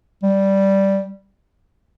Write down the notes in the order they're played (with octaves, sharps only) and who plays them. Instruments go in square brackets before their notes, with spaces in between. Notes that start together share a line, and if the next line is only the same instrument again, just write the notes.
[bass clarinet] G3